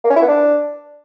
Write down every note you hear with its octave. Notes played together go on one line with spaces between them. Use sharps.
A#3
C#4
E4
B3
D4